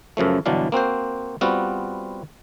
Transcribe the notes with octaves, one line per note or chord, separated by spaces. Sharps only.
F#2 C#3 F3 A3
G1 B2 E3 F#3 D4 F5
A#3 C4 F#4 C5
G3 B3 C4 F4 F#4